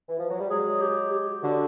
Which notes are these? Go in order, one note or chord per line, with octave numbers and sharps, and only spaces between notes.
E3
F3
F#3
G3
F#3 G#3 G#4
G4
G4
D3 F#4